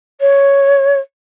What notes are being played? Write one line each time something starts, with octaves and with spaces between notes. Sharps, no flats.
C#5